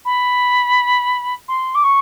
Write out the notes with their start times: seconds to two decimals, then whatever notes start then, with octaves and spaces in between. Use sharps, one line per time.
0.05 B5
1.48 C6
1.74 D6
1.83 C#6